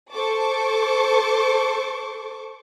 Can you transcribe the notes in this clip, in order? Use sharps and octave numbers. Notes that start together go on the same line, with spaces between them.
A4 C5 C#6 D6